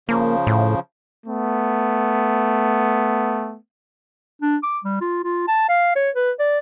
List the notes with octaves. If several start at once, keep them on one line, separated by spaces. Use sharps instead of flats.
C#3 F3 A#3
A2
A3 B3
D4
D6
G3
F4
F4
A5
F5
C#5
B4
D5